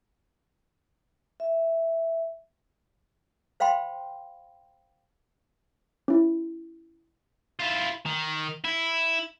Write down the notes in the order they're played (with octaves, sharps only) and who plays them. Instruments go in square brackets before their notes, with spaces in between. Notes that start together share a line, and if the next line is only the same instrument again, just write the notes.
[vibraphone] E5
[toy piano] C5 F5 G5 B5 C6
[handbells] C#4 E4
[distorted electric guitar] E4 F4
D#3
E4